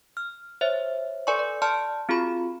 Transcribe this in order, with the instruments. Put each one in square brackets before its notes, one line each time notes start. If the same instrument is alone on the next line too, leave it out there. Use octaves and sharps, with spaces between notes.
[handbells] F6
C5 C#5 E5
A4 B4 D5 G#5 C6 C#6
D5
D5 A5 C6 F6 C#7
C4 F4 F#4 G#4 B5